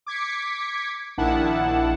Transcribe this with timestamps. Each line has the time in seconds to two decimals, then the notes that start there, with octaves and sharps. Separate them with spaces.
0.06 D6 G#6 B6 C#7
1.17 A#1 D#3 D4 E4 F#5 A5